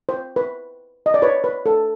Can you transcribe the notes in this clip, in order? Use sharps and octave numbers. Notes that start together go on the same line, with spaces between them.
C5
B4
D#5
D5
B4 C#5
B4
A4